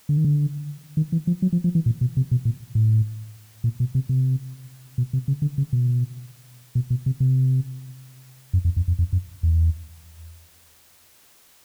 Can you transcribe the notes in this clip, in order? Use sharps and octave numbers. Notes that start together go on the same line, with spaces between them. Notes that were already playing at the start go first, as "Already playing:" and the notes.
D3
D#3
D3
D#3
E3
F3
F#3
F3
F3
E3
A#2
B2
C3
B2
A#2
A2
A#2
B2
C3
C3
B2
C3
C#3
D3
C#3
B2
B2
B2
C3
C3
F#2
F2
F2
F2
F2
F#2
E2